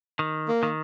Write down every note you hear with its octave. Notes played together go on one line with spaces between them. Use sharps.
D#3
A#3
D#3